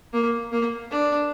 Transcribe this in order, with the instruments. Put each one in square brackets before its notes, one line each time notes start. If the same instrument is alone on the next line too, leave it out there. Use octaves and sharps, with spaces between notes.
[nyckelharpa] A#3
A#3
D4